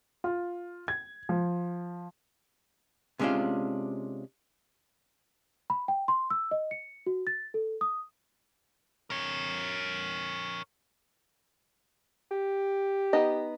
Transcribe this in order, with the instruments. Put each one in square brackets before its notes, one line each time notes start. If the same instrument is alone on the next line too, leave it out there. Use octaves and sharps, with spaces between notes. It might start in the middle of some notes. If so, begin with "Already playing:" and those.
[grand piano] F4
G#6
F3
[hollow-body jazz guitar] C3 G#3 C#4 D4 F4
[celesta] B5
G5
C6
E6
D#5
C#7
F#4
A6
A4
D#6
[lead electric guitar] A#4 C#5
[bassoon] G4
[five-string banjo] B3 D#4 D#5